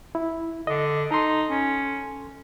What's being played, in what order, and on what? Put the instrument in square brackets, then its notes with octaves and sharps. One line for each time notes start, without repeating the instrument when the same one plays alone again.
[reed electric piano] E4
[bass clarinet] D3 [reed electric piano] D#5
[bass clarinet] D#4 [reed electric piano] A4 C6
[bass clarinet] C#4